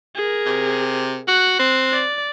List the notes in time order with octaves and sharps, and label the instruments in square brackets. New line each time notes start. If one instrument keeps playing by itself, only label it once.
[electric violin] G#4 A#4
[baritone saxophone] C3
[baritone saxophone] F#4 [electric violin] F#6
[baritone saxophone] C4
[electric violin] D5